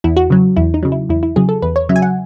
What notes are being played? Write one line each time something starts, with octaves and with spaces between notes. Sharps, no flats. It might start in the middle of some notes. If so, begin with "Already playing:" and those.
E2 E4
F#4
C#3 F#3
E2 E4
D#4
C#3 F#3
E4
E2 E4
E4
C#3 F#3 G#4
A4
E2 B4
C#5
C#3 F#3 E5
G#5
F#5